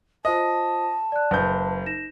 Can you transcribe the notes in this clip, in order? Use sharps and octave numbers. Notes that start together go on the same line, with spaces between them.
F4 C5 D#5 A5 D#6
D5 F#6
F#1 B4 G6
D#4 A#6 E7